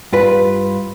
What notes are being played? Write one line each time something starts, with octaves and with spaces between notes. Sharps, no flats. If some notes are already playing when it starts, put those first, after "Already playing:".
G2 F4 B4